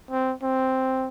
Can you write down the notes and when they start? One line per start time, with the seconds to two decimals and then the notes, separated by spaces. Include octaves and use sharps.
0.11 C4
0.43 C4